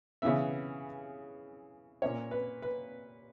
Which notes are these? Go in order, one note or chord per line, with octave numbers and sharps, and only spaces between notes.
C#3 E3 B3 E5
A#2 A#3 C#4 C#5
B4
B4